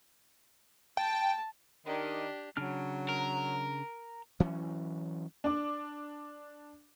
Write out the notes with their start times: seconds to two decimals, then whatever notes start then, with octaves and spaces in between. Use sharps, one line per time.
0.97 G5 A5
1.85 D#3 D4 G4
2.57 C#3 F#3 D4 F6
3.09 A#4
4.40 E3 F#3 C#4
5.44 D4 D6